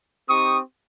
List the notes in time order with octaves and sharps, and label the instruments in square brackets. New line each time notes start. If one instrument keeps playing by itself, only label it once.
[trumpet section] C4 D#4 G4 C#6 D#6